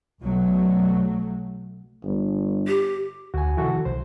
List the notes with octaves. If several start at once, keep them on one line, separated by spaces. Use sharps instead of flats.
B1 B2 F#3 A3
G1
G4
D2 F#4 G#5
C3 D#3 F3 E4 F#4 A4
B1 C5